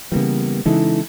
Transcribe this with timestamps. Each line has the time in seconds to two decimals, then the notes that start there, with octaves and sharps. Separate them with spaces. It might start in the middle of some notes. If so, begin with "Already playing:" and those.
0.12 C#3 E3 G3 A#3 B3
0.66 C#3 E3 G#3 D#4 E4 A4